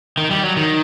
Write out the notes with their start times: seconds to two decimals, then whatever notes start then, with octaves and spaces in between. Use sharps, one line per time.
0.18 D#3
0.31 G3
0.43 F#3
0.57 D#3